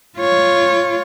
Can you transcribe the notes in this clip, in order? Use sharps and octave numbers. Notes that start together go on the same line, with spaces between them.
F4 C#5